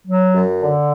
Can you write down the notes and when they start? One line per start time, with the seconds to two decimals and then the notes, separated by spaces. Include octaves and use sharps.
0.07 F#3
0.34 F#2
0.60 D3